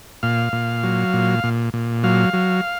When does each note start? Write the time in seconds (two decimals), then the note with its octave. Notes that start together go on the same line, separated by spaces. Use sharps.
0.23 A#2 F5
0.53 A#2
0.83 F#3
1.14 A#2
1.44 A#2
1.73 A#2
2.04 F#3 F5
2.33 F#3